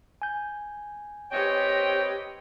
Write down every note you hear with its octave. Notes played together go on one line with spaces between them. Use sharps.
G#5 G6
C4 G4 B4 C#5 D#5 G5